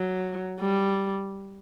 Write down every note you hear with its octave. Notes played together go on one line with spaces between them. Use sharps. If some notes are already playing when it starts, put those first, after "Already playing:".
Already playing: F#3
G3